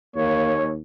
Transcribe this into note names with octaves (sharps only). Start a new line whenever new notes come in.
D#2 A#3 C#5